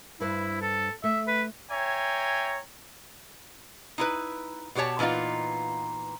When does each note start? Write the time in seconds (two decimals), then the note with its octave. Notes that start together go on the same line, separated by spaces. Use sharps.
0.21 G2 E4 B4 C5
0.62 A4
1.04 A3 E5
1.28 B4
1.70 C#5 E5 G5 G#5 A#5
3.98 D#4 E4 B4
4.75 B2 B3 G4 C#5 A5
4.99 A#2 E3 B3 D#4 F4